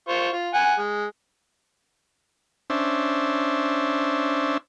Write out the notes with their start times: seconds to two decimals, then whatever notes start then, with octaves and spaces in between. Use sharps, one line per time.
0.08 F4 C5 C#6
0.33 F4
0.54 F#5 G#5
0.78 G#3
2.70 C#4 D4 C5 E5